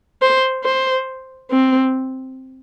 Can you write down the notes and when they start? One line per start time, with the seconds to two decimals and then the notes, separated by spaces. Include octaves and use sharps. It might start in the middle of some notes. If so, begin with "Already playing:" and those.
0.22 C5
0.64 C5
1.51 C4